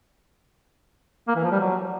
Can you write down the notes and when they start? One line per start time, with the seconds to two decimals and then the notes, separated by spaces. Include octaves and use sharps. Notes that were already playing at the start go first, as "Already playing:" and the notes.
1.28 A#3
1.36 E3
1.44 F3
1.52 G3
1.60 F#3